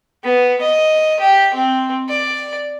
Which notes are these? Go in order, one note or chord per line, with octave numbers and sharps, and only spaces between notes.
B3
D#5
G4
C4
D5